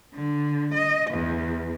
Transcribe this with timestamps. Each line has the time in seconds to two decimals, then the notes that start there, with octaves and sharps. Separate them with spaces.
0.14 D3
0.73 D#5
1.10 E2